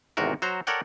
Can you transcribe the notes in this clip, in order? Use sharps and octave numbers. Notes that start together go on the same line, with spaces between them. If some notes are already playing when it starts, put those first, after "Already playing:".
G#1 E2 C3 F#4 A#4
F#3 F#4 C5 A#5
A4 A#4 C#5 D5 F#5 G5